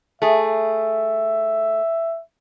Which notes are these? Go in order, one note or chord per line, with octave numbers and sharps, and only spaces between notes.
A3 G#4 E5